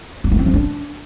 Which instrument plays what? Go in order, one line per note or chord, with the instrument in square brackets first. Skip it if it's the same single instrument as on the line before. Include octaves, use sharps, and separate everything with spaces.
[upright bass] B3
A3
C4
F3
D4